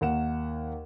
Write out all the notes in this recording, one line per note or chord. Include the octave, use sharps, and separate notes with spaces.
D#2 A#4 F#5 E7